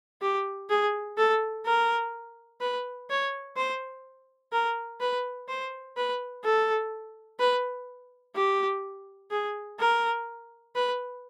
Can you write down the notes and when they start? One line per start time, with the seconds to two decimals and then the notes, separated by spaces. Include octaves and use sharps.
0.21 G4
0.70 G#4
1.18 A4
1.66 A#4
2.61 B4
3.09 C#5
3.57 C5
4.53 A#4
5.00 B4
5.48 C5
5.97 B4
6.44 A4
7.39 B4
8.36 G4
9.31 G#4
9.79 A#4
10.75 B4